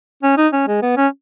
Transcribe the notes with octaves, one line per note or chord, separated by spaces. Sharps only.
C#4
D#4
C#4
G#3
B3
C#4